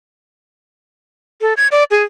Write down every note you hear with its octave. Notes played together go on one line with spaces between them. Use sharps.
A4
G#6
D5
G#4